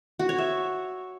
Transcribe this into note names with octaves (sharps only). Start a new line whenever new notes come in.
F#4
C#5
E5